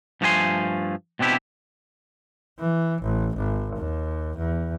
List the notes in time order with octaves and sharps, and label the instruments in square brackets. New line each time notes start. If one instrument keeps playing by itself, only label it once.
[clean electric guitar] G2 F3 A3 F#4 G#5 C6
B2 C4 D4 E4 G4
[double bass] E3
A1
G#1
D#2
E2